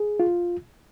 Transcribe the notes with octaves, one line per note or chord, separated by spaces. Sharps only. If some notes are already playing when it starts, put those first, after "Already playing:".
Already playing: G#4
F4